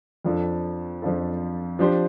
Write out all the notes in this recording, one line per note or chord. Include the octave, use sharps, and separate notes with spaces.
F2 F3 D4 F4 A4
F2 F3 D4 F4 A4
F3 D4 G4 C5